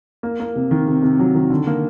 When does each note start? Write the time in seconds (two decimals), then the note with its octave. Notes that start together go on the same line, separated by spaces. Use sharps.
0.23 A#3
0.40 A#3
0.56 C3
0.71 D#3
0.87 C3
1.03 C3
1.19 F#3
1.35 D#3
1.50 D3
1.67 A#3